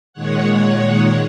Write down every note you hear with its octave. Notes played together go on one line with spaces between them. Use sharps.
A#2 D#3 G#3 C#5 F#5